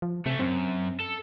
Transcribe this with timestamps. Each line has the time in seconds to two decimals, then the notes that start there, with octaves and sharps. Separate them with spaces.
0.02 F3
0.26 C3 A3 C#4
0.39 F#2 C4
1.00 A4